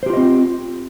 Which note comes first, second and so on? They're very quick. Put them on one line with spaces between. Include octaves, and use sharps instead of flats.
C5 G4 F4 D#5 C4